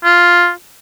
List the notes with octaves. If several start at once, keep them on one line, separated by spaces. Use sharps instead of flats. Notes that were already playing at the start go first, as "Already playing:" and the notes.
F4